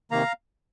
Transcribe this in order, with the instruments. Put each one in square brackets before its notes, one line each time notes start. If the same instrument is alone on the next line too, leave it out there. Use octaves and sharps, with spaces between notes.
[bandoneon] C3 D#3 A#3 F5 A#5